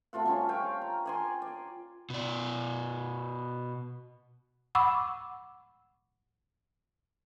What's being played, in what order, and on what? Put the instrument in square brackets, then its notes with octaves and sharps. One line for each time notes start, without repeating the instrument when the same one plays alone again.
[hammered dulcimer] C3 A3 F4 F#5
G3 C#4 F4
F5 G5 G#5 C#6
A#5
D5 G#5 C6
D5
[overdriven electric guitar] B2 D5
[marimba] F#5 B5 C#6 D6 E6